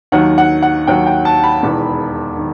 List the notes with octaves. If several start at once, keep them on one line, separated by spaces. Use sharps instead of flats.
D#2 D#3 F#3 F#5
F#5
F#5
D#2 D#3 F#3 G5
G5
A5
B5
E1 E2 D#3
D#3